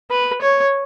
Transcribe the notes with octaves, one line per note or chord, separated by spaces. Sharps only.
B4
C#5